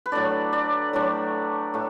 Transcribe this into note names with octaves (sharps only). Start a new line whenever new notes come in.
B4
A2 F#3 A3 D4 D5
D5
A2 F#3 A3 D4
A2 A3